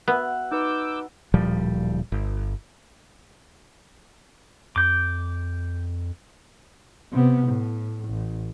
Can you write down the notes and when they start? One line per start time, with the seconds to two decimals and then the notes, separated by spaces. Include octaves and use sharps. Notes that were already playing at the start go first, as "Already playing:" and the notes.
0.08 B3 F#4 E5 F#5 F#6
0.52 D#4 B4 D6 E6 G6
1.34 D1 A#2 F3 G3
2.12 G1
4.76 F2 D6 G6
7.12 C3 B3
7.48 A2
8.09 A1